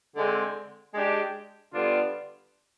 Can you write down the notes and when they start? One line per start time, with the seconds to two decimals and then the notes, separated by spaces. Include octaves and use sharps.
0.17 D3 G#3 C4
0.94 G#3 D4 G4
1.72 D3 G3 B3 D4 F4